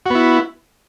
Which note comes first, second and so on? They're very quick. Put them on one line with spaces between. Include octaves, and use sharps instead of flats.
F#4 B3 E4